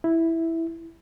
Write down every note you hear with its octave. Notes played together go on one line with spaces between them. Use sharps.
E4